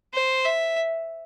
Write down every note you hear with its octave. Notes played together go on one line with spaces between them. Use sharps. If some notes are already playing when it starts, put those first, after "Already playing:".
C5
E5